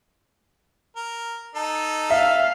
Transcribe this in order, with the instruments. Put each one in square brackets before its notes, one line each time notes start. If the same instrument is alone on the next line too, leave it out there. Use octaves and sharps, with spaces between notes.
[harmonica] A#4
D#4 A4
[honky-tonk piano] E5 [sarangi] F5